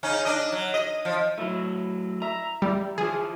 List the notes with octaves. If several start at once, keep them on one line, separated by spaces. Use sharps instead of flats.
C#3 C#4 D#4
D4 D#5
F#3
D#5
F3
F#3 A3 E4
E5 A#5
G3 E4
E3 F4 G#4